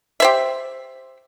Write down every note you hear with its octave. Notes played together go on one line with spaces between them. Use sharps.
G4 C5 E5